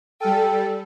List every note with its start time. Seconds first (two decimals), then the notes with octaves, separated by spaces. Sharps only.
0.20 G3 A4 G5 G#5 F6